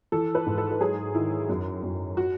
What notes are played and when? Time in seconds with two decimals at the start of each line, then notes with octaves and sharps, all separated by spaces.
0.12 E3 A4
0.35 B4
0.46 G#2
0.58 A4
0.71 A4
0.80 F#3 G#4
1.15 D#3 E4
1.49 F#2
1.83 F#2
2.17 F#4